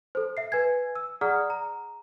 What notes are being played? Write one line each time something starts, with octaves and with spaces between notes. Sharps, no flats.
A4 C5
E5 C7
B4 G#5 G#6
E6
G#4 D5 F#5 A#5 D#6 F6
A#5